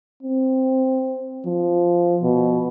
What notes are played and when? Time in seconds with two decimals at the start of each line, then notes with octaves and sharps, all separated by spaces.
0.23 C4
1.46 F3
2.24 B2